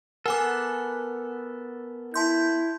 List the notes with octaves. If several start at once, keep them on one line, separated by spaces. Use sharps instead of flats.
B3 A4 A#4 F#5 G#5 D6
E4 A5 C6 G6